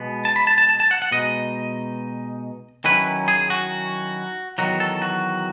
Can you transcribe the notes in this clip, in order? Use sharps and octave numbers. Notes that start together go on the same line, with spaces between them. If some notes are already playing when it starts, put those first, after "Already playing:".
Already playing: B2 G#3 B3
A5
B5
A5
A5
A5
A5
F#5
F#5
B2 G#3 D#4 D#5
D#3 F#3 C#4 E4 B4
G#4
F#4
E2 D#3 F#3 F#4
A4
F#4